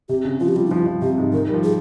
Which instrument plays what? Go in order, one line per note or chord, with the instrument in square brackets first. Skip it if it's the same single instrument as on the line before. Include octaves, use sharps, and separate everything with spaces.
[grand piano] C3 [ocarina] G4
[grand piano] C#3
[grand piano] F3 [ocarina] F4
[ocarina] G4
[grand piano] G3 [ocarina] F4
[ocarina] D#4
[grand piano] F3 [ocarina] F4
[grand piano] F3
[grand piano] C3 [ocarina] G4
[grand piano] G#2
[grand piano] D#3 [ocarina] A#4
[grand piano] G3
F3
[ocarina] G#4